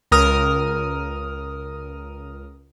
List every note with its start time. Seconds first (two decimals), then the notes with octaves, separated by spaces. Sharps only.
0.12 C#2 A#4 D#6 F6